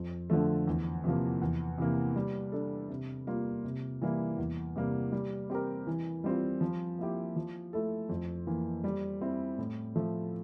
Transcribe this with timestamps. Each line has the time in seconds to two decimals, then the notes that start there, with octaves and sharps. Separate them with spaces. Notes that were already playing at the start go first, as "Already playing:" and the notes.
Already playing: F2
0.30 D3 F3 A3
0.67 E2
1.04 C3 F3 A#3
1.42 E2
1.78 C3 E3 A#3
2.16 G3
2.52 D4 A4
2.90 C3
3.27 G3 A#3 F4
3.64 C3
4.01 E3 G3 A#3 E4
4.38 E2
4.76 C3 G3 A#3
5.12 G3
5.50 C4 G4 A#4
5.87 E3
6.24 G3 C4 F4
6.61 F3
6.99 A#3 E4 G4
7.36 F3
7.73 A3 E4 A4
8.09 F2
8.47 E3 A#3
8.84 G3
9.21 C4 E4
9.58 A2
9.96 F3 A3